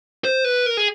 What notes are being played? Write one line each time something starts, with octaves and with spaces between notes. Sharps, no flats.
C5
B4
A#4
G#4